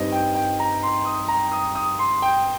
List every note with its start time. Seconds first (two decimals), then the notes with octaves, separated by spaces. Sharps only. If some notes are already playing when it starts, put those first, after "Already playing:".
Already playing: G2 G3 C4 D#4 D#5
0.12 G5
0.35 G5
0.60 A#5
0.83 C6
1.05 D#6
1.28 A#5
1.52 D#6
1.75 D#6
1.99 C6
2.22 G5